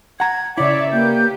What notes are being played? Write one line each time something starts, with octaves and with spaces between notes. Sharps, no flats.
F#5 A#5 G#6
C#3 E4 C#5 D5 E5 D6
A#3 G4 B4 G6